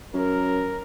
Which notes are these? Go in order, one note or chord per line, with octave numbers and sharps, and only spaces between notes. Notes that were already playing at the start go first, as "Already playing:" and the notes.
F#2 A#4